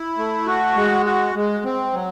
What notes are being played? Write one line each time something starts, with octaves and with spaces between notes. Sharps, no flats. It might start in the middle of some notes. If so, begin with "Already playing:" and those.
Already playing: E4
A3
F#4
G#3
F#4
G#3
C4
F#3